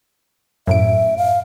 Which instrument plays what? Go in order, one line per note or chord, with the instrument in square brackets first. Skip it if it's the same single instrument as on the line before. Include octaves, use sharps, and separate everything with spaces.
[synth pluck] F#2 A2 D7 [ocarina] E5
[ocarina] F5